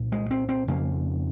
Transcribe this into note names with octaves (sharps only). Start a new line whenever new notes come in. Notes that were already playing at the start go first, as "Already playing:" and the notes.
Already playing: C2 A#2
G#3
C4
C4
F2 C#3 A#3